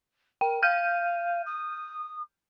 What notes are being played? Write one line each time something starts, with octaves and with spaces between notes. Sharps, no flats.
A#4 G5
F5 F6 G6 D#7
D#6